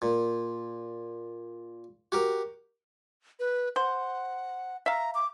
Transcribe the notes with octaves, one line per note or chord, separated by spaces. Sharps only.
A#2
F#4 G4 A#4
B4
C5 F#5
E5 F5 A#5
D6